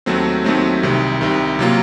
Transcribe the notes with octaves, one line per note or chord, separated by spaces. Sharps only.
D#2 D#3 F#3 A3 C4
D#2 D#3 F#3 A3 C4
C2 C3 D#3
C2 C3 D#3
C3 F#3 A#3 F4